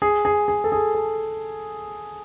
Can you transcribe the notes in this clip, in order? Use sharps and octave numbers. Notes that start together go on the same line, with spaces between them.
G#4
G#4
G#4
A4
G#4
A4